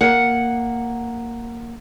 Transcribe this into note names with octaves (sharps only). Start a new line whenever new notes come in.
A#3 F#5